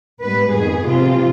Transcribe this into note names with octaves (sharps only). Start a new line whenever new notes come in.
G#2 G3 B3 B4
F2 D#3 B3 G#4
C3 F3 C4 F4